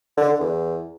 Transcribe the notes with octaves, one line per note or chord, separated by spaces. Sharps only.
D3
D3
E2